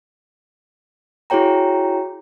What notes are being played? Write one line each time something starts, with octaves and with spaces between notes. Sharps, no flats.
E4 F#4 G#4 C#5 G5 A#5